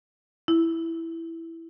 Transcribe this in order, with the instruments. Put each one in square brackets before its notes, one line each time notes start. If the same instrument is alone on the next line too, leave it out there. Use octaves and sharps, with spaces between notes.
[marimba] E4